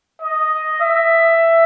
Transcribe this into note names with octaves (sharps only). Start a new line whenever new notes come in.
D#5
E5